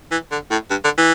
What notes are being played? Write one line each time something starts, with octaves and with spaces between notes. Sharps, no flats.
E3
D3
A2
G2
D3
E3